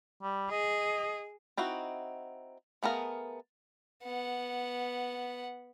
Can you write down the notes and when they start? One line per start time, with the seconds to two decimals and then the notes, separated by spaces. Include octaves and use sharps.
0.22 G3
0.51 G#4 D#5
1.57 C4 D#4 E4 F#4
2.83 A3 B3 G#4 A#4 F5
4.03 B3 F#5